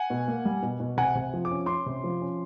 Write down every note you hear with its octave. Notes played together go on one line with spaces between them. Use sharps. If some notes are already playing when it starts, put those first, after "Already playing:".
Already playing: F#5 G#5
B2
A#3
G3
B2
B2
C3 F#5 G#5
C3
F3
D6
C#4
C#4 C6 D6
C3
F3
C#4